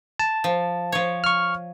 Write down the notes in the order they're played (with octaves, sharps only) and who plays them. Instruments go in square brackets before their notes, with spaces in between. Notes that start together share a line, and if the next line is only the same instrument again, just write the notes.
[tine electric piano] A5
[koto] F3
F3 C#5
[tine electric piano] C#6 F6